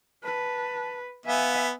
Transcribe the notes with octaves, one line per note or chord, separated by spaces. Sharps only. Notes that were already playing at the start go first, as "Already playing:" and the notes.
B4 A5
B3 E5 F5 G#5